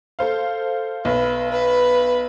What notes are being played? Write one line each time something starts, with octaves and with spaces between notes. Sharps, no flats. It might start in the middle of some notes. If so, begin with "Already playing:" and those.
A4 C5 F5
B1 B4
B4